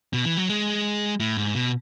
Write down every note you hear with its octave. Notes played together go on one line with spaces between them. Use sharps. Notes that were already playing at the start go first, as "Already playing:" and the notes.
B2
E3
F#3
G#3
A2
G#2
B2